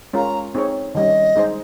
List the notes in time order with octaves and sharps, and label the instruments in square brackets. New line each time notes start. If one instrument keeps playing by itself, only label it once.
[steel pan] G#3 C#4 F4 A#4 [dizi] A#5
[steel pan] C4 D#4 G#4 C#5
[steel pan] D#3 G3 C#4 [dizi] D#5
[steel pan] G#3 D#4 G#4 C5